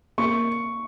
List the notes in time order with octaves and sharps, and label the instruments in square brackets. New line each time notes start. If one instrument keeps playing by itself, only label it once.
[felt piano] A#3 [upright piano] C#6